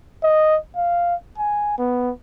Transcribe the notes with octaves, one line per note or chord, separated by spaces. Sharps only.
D#5
F5
G#5
B3